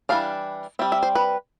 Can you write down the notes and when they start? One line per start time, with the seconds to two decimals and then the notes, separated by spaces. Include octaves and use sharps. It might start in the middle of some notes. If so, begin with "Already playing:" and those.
0.09 E3 G3 D4 F5
0.79 G3 C4 E5
0.92 E5
1.03 C5
1.15 B4